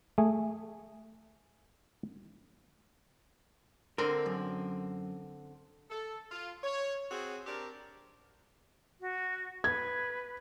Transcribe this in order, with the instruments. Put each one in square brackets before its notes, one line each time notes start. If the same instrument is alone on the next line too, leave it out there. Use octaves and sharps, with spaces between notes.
[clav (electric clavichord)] A3 G#4
[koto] D3 C4 [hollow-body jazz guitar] A#4
[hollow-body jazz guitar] F#2
[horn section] A4
F4
C#5
C4 F#4 G#4
C4 D4 G4 A#4
[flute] F#4
[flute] B4 [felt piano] G#6